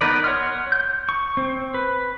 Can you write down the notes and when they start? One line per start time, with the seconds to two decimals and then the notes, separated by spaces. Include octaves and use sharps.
0.01 B3 D#4 A#4 B4 D5
0.24 C#5 F#5 C6 F6
0.72 G6
1.09 C#6
1.37 C4
1.74 B4